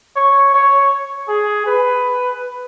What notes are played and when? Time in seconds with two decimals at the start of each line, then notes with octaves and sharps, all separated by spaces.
0.16 C#5
0.54 C#5
1.28 G#4
1.66 B4